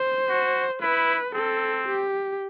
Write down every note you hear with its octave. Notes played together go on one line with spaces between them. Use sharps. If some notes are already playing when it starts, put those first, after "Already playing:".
Already playing: C5
F#4
E4 B4
C4 A4
G4